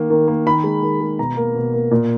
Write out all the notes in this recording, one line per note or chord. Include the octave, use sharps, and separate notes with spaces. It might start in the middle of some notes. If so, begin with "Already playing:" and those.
Already playing: D#3 A#3
D#3
A#3
D#3 B5
G#3
D#3
G#3
B2 A#5
A#3
B2
A#3
A#2